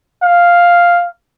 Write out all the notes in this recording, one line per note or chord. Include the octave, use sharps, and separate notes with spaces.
F5